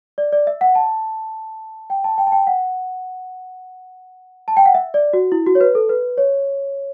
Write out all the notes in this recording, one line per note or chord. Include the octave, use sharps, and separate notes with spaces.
D5
D5
E5
F#5
A5
G5
A5
G5
A5
G5
F#5
A5
G5
F#5
E5
D5
F#4
E4
F#4
C#5
B4
A4
B4
C#5